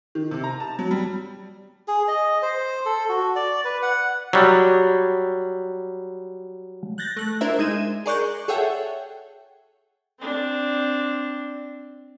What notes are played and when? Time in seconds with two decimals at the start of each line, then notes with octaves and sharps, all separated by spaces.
0.15 D#3
0.31 C3
0.44 A#5
0.60 A5
0.79 F#3
0.91 G3
1.88 G#4
2.08 D#5
2.42 C5
2.86 A4
3.09 F#4
3.36 D5
3.65 B4
3.82 F#5
4.33 F#3 G3
6.98 F#6 G6 A6 A#6
7.17 A3 F#6
7.41 D4 E4 A#4 C5 E5
7.59 G#3 D#4 G#6 D#7 E7
8.06 G#4 A#4 D5 C#6 F#6 G6
8.48 G#4 A4 C#5 E5 F#5 G5
10.19 C4 D4